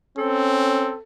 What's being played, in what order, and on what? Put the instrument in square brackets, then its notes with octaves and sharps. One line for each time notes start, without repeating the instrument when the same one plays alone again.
[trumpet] C4 [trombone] C#4 [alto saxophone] A4